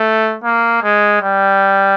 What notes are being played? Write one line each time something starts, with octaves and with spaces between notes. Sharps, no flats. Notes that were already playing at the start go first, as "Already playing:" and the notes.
Already playing: A3
A#3
G#3
G3